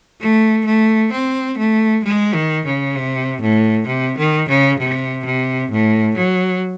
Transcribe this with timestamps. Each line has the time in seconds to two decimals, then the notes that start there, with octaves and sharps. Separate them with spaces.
0.20 A3
0.65 A3
1.12 C4
1.58 A3
2.04 G#3
2.34 D#3
2.65 C#3
2.96 C3
3.41 A2
3.87 C3
4.18 D#3
4.49 C#3
4.79 C3
5.25 C3
5.70 A2
6.17 F#3